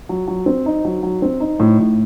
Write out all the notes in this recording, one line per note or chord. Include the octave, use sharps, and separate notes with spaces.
F#3
F#3
C4
D#4
F#3
F#3
C4
D#4
A2
A2